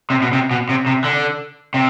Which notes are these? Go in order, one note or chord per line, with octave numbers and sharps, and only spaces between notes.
C3
B2
C3
B2
C3
C3
D3
C3